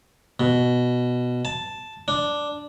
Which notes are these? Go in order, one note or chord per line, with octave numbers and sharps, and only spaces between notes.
B2
A5
D4